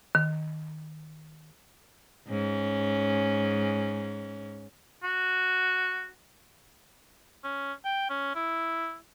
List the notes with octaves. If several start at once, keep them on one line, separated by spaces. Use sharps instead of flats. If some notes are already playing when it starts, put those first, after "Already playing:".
D#3
G#2 C#4
F#4
C#4
G5
C#4
E4